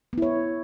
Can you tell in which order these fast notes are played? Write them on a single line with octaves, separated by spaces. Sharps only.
B3 E4 C#5